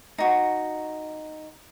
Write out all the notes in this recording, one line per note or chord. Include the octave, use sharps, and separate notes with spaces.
D#4 F#4